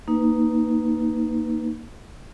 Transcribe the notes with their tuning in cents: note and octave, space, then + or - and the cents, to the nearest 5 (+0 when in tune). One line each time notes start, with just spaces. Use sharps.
A#3 +0 D#4 +0 B4 +0